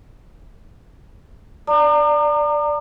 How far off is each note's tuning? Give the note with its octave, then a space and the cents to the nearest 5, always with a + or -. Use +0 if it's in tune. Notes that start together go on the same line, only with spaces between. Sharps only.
D5 +0 A#5 -25 D6 +45